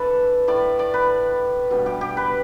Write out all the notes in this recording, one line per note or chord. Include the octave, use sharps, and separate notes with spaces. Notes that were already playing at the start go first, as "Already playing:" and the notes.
Already playing: E3 D4 A4 B4 D5
A2 A3 E4 D5
D5
B4
B2 G3 D4
G4
G4
B4